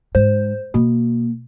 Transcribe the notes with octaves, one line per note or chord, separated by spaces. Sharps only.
G#2 C5
B2 A#3